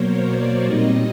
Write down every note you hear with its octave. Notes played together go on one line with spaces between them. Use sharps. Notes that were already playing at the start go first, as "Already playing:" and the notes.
Already playing: B2 F#3 A#3 A#4 C5 C#5
D5
A#2 G3 C4 D#4 D#5